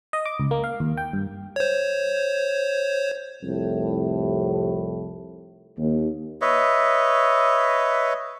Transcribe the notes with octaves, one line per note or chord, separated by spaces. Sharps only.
D#5
D6
C#2
A#3
F5
D#2
G5
G2
C5 C#5
C2 F2 A2
D#2
B4 C#5 D#5 E5